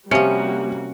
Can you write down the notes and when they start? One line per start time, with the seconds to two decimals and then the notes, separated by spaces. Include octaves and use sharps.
0.11 C3 F3 G3 A#3 C#4 F#4 G4 C#7